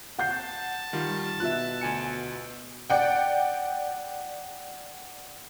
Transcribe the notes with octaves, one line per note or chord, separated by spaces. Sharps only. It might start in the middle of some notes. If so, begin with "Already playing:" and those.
F#5 A5 G6 C7
D#3 G3 F4
B2 F4 E5 F#6
D2 G#5 C#7
D5 F#5 G5